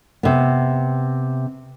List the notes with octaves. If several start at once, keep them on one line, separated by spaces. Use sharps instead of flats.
C3 B3